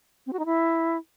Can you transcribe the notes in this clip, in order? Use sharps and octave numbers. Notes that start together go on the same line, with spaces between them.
C4
F#4
D#4
E4